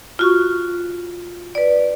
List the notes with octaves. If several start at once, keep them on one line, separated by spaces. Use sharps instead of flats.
F4 F#4 C#6
B4 D5